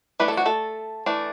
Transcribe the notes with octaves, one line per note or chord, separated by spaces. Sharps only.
E3 A3 D4 B4
A4
F#4
A3 A4
E3 A3 D4